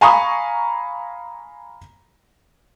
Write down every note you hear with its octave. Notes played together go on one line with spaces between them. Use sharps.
F5 G#5 A#5 B5 C#6 D#6